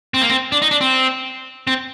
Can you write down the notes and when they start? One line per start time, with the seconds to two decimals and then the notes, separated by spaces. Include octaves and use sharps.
0.14 C4
0.22 A#3
0.29 C4
0.52 D4
0.62 D#4
0.71 D4
0.81 C4
1.67 C4